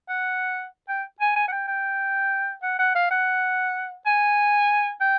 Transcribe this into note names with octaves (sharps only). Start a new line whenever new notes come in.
F#5
G5
G#5
G#5
F#5
G5
G5
F#5
F#5
F5
F#5
G#5
G5